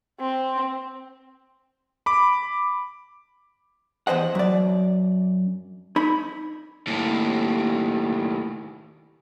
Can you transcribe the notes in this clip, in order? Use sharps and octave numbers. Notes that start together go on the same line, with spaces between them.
C4
B5 D6
E2 C5 D#5 F#5
F#2 D5
D#4 B5
D#2 A2